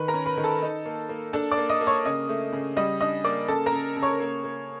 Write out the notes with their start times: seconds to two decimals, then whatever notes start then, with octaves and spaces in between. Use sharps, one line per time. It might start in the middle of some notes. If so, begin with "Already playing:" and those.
Already playing: D#3 B4 B5
0.08 A#4 A#5
0.14 C#4
0.26 B4 B5
0.37 D#3
0.44 A4 A5
0.62 D#4
0.86 A#3
1.09 A#3
1.33 D4 A4 A5
1.52 D5 D6
1.57 A#3
1.69 D#5 D#6
1.81 A#3
1.87 C#5 C#6
2.05 C#3 D#5 D#6
2.29 A3
2.53 C#3
2.77 G3 D#5 D#6
3.00 D4 D#5 D#6
3.24 A#3 D5 D6
3.48 C#3 A4 A5
3.66 A#4 A#5
3.72 C#3
3.96 C#3
4.02 C#5 C#6
4.20 A#3
4.44 A#3